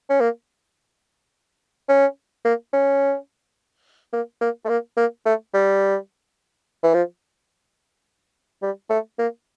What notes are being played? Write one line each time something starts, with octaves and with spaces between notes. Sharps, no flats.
C#4
A#3
C#4
A#3
C#4
A#3
A#3
A3
A#3
A#3
A3
G3
E3
F3
G3
A3
A#3